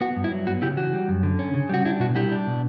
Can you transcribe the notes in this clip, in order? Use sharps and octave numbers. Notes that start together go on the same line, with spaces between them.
B3 F#4
G2
E4
F#3
B3 F#4
C#3 E4 G4
E3 F#4
G3
F#2
D3
C#4
C#3
G3 F#4
D4 E4
B2 F#4
G3 E4 G4
D4
B2